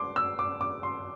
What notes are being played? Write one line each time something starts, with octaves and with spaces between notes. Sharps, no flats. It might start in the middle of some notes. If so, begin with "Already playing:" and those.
Already playing: C6 D6
E6
D6
D6
C6